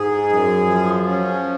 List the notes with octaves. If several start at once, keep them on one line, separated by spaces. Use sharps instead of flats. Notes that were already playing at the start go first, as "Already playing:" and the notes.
Already playing: G#2 G#4
F#2
F3
C#4